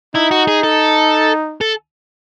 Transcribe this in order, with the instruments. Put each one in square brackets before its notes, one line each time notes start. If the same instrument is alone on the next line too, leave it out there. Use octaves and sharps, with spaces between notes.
[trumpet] D#4 [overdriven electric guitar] E4
[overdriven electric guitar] F#4
G#4
A4
A4